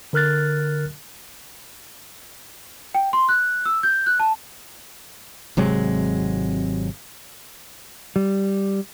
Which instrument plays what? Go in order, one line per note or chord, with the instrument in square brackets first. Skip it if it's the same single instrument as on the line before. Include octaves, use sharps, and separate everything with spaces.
[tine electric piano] D3 A#4 F6 F#6 A6
[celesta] G5
C6
F#6
E6
G6
F#6
A5
[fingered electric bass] G#1 C3 F#3 G#3
[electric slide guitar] G3